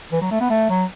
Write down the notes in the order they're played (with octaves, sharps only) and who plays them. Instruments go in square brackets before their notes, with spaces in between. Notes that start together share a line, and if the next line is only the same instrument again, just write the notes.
[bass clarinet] E3
F#3
A3
B3
A3
F#3